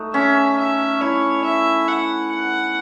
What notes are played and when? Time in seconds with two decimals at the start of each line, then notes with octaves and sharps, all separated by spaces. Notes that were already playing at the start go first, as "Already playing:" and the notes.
Already playing: A3 D#4 F#4
0.14 C#4 E5
0.58 E5
1.01 E4 C#5
1.44 E5
1.88 F#5
2.32 F#5